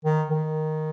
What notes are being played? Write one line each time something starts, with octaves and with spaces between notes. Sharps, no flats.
D#3
D#3